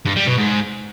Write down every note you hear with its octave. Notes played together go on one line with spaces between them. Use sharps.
G2
G3
B2
G#2